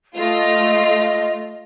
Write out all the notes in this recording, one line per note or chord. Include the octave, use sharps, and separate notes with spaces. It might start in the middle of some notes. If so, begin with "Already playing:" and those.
A3 F4 D#5